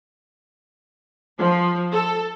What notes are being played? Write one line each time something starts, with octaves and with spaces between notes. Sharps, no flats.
F3
A4